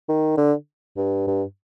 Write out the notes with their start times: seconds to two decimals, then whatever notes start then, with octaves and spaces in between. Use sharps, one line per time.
0.09 D#3
0.37 D3
0.97 G2
1.27 G2